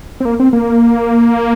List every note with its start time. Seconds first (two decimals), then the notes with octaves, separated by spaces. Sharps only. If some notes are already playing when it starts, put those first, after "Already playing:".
0.20 C4
0.25 A#3
0.40 C4
0.53 A#3